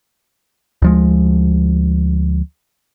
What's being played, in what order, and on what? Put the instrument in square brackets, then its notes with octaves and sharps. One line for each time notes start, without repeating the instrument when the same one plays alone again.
[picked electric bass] D2 F3 G#3